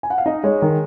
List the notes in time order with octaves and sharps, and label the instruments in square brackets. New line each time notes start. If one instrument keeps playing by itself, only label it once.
[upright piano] G#5
F#5
F5
[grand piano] D#4 [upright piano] D#5
[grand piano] G#3 [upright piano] C#5
[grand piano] D#3 [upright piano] A#4